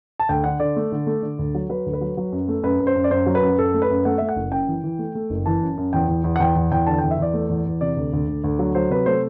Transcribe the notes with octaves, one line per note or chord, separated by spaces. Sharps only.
A5
D2 G5
D3 F#5
D3 D5
A3
D3
A3
D3
D2
F#3
F#3 B4
D2
B4
F#3
F#3
F#2
A3
F#2 B4
F#2
C5
F#2
D5
F#2 C5
F#3
B4
F#2
F#2 A4
A3
B4
F#2
A3 F#5
A3 E5
F#5
F#1
F#2 G5
E3
E3
A3
A3
F#1
E3 A5
F#2
F#2
E2 G5
E2
E2
F#5
E2 G5
E2
E2 G5
D3 A5
E2 G5
E5
E2 D5
A3
E2
E2
C3 D5
D2
D2
D2
D2
F#3
F#3 C5
C3 B4
A3 C5